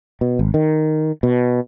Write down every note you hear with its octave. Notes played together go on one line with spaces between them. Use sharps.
B2
G#1
D#3
B2